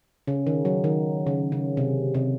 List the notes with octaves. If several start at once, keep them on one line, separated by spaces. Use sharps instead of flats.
C#3
D#3
F#3
D#3
C#3
C#3
C3
C3